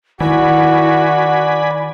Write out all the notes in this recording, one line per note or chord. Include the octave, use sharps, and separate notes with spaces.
D#3 E4 F#4 D5 G#5 B5